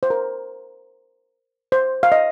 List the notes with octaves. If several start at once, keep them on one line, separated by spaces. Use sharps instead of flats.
C5
A#4
C5
F5
D#5